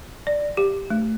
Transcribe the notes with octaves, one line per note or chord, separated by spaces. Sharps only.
D5
G4
A3